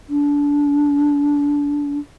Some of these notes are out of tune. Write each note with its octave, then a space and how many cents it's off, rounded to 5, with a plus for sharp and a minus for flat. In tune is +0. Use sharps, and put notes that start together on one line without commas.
D4 -25